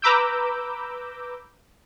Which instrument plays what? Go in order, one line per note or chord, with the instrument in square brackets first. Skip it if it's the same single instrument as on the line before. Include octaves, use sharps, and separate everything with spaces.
[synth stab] B4 A#5 B5 D6 E6 G6